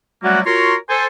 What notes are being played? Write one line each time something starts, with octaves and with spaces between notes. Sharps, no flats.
F#3 G3 A3 A#3 C#4 F#4
F4 F#4 A#4 C#5 A#5 C6
A4 C5 G#5